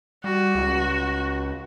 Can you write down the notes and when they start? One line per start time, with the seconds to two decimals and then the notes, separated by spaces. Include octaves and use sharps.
0.24 G3 F#4
0.55 C#2